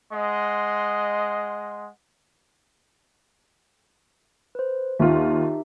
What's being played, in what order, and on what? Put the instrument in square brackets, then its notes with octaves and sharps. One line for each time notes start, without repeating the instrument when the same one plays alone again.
[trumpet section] G#3 D#5 F#5 C6
[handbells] B4 C5
[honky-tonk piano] D#2 F4 [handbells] D#4 G4 E5